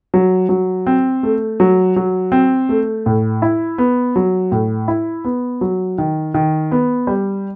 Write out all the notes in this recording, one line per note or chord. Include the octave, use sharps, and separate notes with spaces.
F#3
F#3
C4
A3
F#3
F#3
C4
A3
A2
E4
B3
F#3
A2
E4
B3
F#3
D#3
D#3
B3
G3